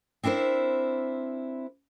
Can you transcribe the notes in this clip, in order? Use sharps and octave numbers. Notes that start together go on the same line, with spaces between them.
C4 D4 E4 A#4 C5